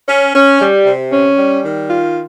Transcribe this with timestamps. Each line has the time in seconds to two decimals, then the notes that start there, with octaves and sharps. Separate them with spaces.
0.09 C#4
0.35 C#4
0.61 G3
0.86 C3
1.12 C#4
1.38 G3
1.65 D#3
1.90 F4